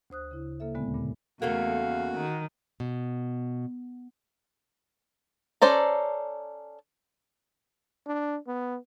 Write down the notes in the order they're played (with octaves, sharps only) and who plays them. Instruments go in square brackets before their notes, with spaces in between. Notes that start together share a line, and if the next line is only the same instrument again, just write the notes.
[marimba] D2 C5 D#6 F#6
C#3 E4
C#3 A#3 A4 E5
D#2 A#2 D3 G#3 B3 C4
G2 A#2 C#3
[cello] E2 [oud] C#3 A3 A#3 [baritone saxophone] F#4 [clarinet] F5
[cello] D#3
[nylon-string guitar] B2
[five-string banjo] C#4 A4 C5 D5 A#5
[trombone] D4
B3